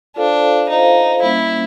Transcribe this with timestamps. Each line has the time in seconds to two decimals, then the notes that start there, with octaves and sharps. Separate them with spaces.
0.16 D4 F4 A4 C5 F5
0.69 D#4 F4 A4 C5 F5
1.22 G3 A#3 C#4 E4